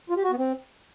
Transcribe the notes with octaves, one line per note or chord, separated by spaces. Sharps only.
F4
G4
F#4
B3
C4